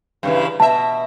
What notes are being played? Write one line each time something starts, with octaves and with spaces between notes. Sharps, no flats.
G2 C#3 E3
B2 E5 A5